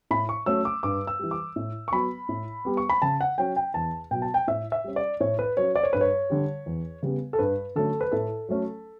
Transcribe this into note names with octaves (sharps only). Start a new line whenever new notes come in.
A2 B5
C#6
F#3 A3 C#4 E6
D6
G2 D6
E6
E3 G3
D6
A2
C#6
F#3 B3 B5
A2
G3 B3
C#6
B5
C#3 A5
F#5
F#3 C#4 G5
G5
E2 A5
B2 F#3 G5
A5
G5
A2 E5
E5
G3 C#4
D5
A2 C#5
B4
F#3 C#4 C#5
D5
C#5
G2 B4
C#5
D3 G3
E2
C#3 G3 B3
A4
G2 B4
D3 F#3 A3 C#4 A4
B4
A2 A4
F#3 A3 C#4